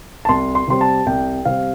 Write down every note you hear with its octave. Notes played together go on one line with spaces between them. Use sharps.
A5
C2 C6
C6
C3 G3 C4 C6
A5
C2 G5
C3 G3 C4 F5